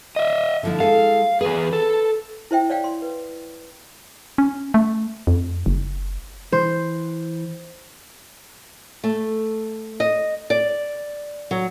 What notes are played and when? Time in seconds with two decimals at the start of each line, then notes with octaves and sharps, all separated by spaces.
0.16 D#5 E5
0.63 D3 F3 E4
0.80 G#3 E4 A4 F5
1.41 E2 G#4 B4
1.73 A4
2.51 E4 C5 E5 G5
2.70 C#5 D5 F5 G5
2.84 C6
3.02 B4
4.38 C#4
4.74 A3
5.27 F2
5.66 F#1
6.52 E3 C5
9.04 A3
10.00 D#5
10.50 D5
11.51 F#3